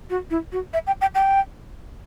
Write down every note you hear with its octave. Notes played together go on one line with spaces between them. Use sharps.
F#4
E4
F#4
E5
G5
G5
G5